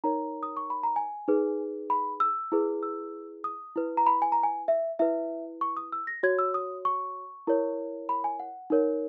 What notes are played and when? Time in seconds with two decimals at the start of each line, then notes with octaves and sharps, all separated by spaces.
0.04 D#4 A#4 C#5 A#5
0.43 D#6
0.57 C#6
0.70 B5
0.83 A#5
0.96 G#5
1.28 D#4 G#4 B4
1.90 B5
2.20 E6
2.52 E4 G#4 B4
2.83 E6
3.44 D#6
3.76 E4 B4
3.97 A#5
4.07 B5
4.22 G#5
4.32 A#5
4.43 G#5
4.68 E5
4.99 E4 B4 E5
5.61 C#6
5.77 D#6
5.92 E6
6.07 A#6
6.23 F#4 C#5 G#6
6.39 E6
6.54 D#6
6.85 C#6
7.47 E4 A#4 C#5
8.09 B5
8.24 G#5
8.40 F#5
8.70 D#4 A#4 C#5